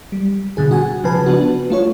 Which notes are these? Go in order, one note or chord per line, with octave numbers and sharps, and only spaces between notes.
G3
B2 D3 G#4
F#4 F#5 G#5
C#3 F3 B4 A5
B3 D4 F#4
A3 F4 C#5